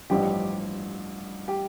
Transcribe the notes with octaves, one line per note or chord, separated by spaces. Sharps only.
A1 G2 F3 G4
G4